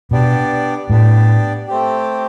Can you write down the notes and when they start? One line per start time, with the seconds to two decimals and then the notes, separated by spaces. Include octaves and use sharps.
0.11 B2 B3 D4 G4 D5
0.90 A2 B3 D4 G4 D5
1.68 A3 C4 G4